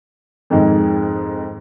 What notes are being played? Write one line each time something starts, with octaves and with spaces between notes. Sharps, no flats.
F2 G#2 D#3 G#3